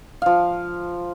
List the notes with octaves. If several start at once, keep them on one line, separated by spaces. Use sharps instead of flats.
F3 F5